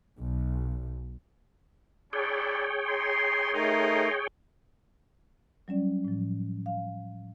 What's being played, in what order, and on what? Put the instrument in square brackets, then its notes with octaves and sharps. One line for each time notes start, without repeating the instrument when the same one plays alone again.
[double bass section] B1
[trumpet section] D4 E4 D5 [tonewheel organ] G#4 C#5 G5
[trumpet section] D#4 C6
[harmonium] A3 D#4 A#4 [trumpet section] D#5 F5 C6
[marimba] F#3 G3 C#4 D5
A2 F3
F5